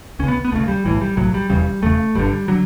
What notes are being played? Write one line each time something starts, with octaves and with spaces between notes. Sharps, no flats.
C#2 C#3 B3 C#4
B3
C#2 C#3 A3
G3
B1 A2 E3
G3
B1 A2 F#3
G3
E1 E2 C#3 G3
E1 E2 C#3 A3
G1 G2 D3 G3
D3 F#3